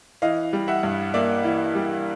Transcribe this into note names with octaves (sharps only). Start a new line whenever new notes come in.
E3 D#5 F5
G3
E5 F#5
G2
A#3 D5 E5
E3
G3